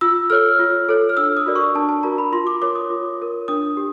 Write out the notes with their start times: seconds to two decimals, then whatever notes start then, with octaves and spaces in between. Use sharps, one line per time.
0.01 F4 E6
0.30 A4 C#5 F6
0.59 F4
0.89 A4 C#5
1.09 F6
1.17 D4 E6
1.37 D#6
1.46 F#4 A#4 D5
1.56 C#6
1.75 D4 A5
1.89 A5
2.03 F#4 A#4 D5 A#5
2.18 B5
2.33 F4 C6
2.47 D6
2.62 A#4 C#5 D6
2.75 D#6
2.90 F4
3.19 A#4 C#5
3.48 D4 D#6
3.77 G4